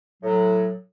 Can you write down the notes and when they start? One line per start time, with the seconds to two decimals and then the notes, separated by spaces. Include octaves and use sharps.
0.22 A2 F#3